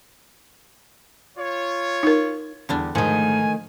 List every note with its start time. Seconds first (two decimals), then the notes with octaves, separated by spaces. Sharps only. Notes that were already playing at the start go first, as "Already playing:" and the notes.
1.38 F4 C#5
2.03 D#4 A#4
2.69 E2 D3 G3 D4
2.95 G#2 D#3 F3 A3 G#5